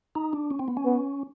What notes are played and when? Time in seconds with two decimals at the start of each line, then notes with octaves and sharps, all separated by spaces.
0.15 D#4
0.33 D4
0.51 C#4
0.59 C4
0.68 B3
0.77 C#4
0.85 B3